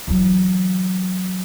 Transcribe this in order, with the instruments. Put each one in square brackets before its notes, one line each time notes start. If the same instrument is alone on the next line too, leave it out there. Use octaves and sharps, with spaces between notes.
[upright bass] E3 F#3